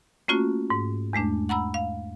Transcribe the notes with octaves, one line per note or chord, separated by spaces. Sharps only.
A3 A#3 C#4 F4 F#4
G#2
E2 G#3 A3 D4
F#5 A#5 B5 E6
F5